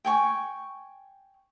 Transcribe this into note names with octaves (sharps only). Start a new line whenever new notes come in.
G5 G#5 C#6